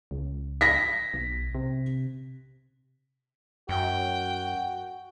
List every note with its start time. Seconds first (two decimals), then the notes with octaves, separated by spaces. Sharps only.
0.11 C#2
0.61 A#6 B6
1.14 B1
1.55 C3
3.69 F#2 F#4 G5